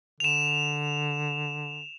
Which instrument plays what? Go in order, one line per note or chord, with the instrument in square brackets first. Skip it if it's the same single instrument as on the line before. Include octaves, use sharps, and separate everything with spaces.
[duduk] D3 [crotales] E7 F7